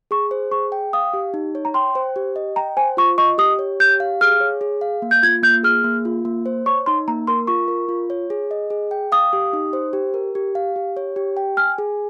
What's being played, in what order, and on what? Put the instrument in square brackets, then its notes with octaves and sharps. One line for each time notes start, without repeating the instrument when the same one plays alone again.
[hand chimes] G#4 [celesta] C#6
[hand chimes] C5
[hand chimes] G#4 [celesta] C#6
[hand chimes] G5
[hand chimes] F5 [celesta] D#6
[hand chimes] G4
D#4
C#5
[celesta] A#5
[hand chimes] G5 [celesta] C6
[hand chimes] C5
G4
D#5
[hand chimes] G5 [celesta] A#5
[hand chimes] C5 [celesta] G#5
[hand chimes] F4 [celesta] C#6
[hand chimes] D#5 [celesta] C#6
[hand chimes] G4 [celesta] D#6
[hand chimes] C#5
[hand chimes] G4 [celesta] G6
[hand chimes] F5
[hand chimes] G#4 [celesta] F6
[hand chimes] C#5
G#4
F5
A#3
[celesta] G6
[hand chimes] F4 [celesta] G#6
[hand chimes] A#3 [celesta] G6
[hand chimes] G#4 [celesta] F6
[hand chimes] A#3
F4
A#3
C5
[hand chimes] C#5 [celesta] C#6
[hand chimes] D#4 [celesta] C6
[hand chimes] A#3 [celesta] A#5
[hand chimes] A#4 [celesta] C6
[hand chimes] F4 [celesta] C#6
[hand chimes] A#4
F4
C#5
G#4
D#5
G#4
G5
[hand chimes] F5 [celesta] D#6
[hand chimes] G4
D#4
C5
G4
A#4
G4
F5
G4
C#5
G4
G5
[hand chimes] G#5 [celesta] F6
[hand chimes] G#4